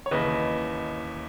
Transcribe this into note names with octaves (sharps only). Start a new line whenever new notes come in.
C#5
D#2 C#3 E3 B4 D#5